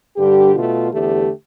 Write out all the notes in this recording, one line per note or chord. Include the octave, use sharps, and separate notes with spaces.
G2 D3 G3 G4
B2 A3 F4
E2 D3 A3 G4